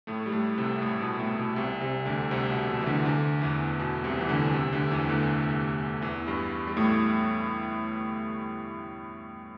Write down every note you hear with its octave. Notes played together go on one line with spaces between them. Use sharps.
A2 A3
G3
A2 A3
C2 C3
A2
B2
A2
B2
C2 C3
C2 C3
D2 D3
C2 C3
B2
B2
E3
D2 D3
D2 D3
E2 E3
B2
C2 C3
E3
D2 D3
C2 C3
D2 D3
E2 E3
D2 D3
E2 E3
G2 G3
G3
A2 A3